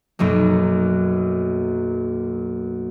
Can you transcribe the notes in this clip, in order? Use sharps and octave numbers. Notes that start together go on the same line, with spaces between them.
B1 F#2 F#3 A#3